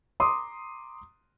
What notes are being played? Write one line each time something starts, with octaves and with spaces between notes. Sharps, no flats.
A#5 C6 D6 D#6